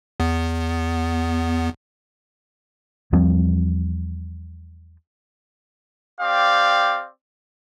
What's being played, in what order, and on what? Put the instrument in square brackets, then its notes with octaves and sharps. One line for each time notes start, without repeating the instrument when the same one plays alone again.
[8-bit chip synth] E2 B3
[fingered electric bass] E2 F3 G3 C4
[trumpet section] C4 G4 D5 F5